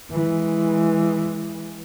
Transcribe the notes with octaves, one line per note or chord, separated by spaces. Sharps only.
E3 G#3